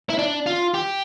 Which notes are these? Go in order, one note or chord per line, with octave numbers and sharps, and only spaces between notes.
E4
D4
F4
G4